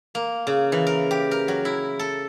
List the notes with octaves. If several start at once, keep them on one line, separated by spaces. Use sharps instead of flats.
A#3
C#3
E3
A#4
G4
A#4
F#3
E4
A4